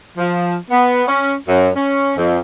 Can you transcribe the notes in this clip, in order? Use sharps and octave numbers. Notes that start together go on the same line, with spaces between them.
F3
B3
C#4
F#2
C#4
F2